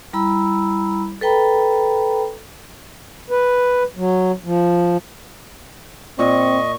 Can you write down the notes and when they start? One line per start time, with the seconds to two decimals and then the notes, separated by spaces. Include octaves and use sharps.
0.13 G3 E4 A#5 B5 E6
1.21 A4 B4 G5 A#5 B5
3.30 B4
3.97 F#3
4.44 F3
6.19 A#2 C4 D#5 C#6